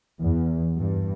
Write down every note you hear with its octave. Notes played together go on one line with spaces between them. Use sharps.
E2
G2